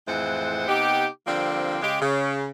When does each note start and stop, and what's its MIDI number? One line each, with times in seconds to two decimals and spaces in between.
0.07 0.66 41
0.07 0.66 45
0.07 0.66 52
0.07 0.66 56
0.07 0.66 72
0.07 0.66 78
0.68 1.05 48
0.68 1.05 59
0.68 1.05 63
0.68 1.05 67
1.27 1.78 50
1.27 1.78 53
1.27 1.78 55
1.27 1.78 58
1.27 1.78 60
1.81 1.99 49
1.81 1.99 56
1.81 1.99 67
2.01 2.48 49